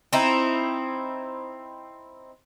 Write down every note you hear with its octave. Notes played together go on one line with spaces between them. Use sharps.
C4 D#4 E4